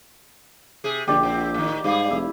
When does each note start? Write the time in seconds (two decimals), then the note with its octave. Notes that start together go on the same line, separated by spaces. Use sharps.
0.84 C3 G#4
1.08 A#1 D3 G4 D5
1.23 A#2 C4
1.54 A2 D#3
1.84 G#2 G3 G#4 F5
2.11 F1 E4